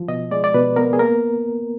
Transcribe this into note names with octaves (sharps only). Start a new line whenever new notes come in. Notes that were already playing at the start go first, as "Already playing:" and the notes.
Already playing: F3
B2 D#5
G#3 D5
D5
B2 B4
B3 A#4
G#4
A#3 A#4